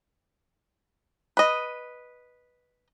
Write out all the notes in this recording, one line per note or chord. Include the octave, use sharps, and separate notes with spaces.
B4 D#5